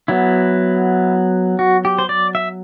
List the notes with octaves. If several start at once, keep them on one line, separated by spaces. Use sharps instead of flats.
F#3 B3 E4
F#4
G4
C5
D5
E5